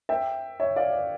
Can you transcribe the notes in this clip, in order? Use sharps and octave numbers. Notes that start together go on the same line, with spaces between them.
E5 G5
C#5 E5
D5 F5
D5